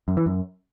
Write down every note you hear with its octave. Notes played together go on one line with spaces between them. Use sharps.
F#2
E3
F#2